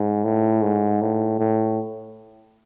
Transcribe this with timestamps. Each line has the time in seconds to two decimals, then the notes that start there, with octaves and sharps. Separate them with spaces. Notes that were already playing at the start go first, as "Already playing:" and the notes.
Already playing: G#2
0.24 A2
0.62 G#2
1.01 A2
1.39 A2